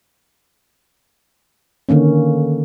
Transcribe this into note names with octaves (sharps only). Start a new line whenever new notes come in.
D3 D#3 A#3 C#4